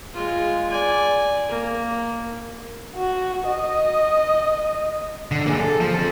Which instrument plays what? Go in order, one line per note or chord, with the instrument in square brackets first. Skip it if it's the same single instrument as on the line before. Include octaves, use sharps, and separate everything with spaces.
[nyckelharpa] G#3 F4
D5 G#5
A#3
[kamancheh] F#4
D#5
[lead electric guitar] D3
A#3 G#4
A4
F3
C4 A4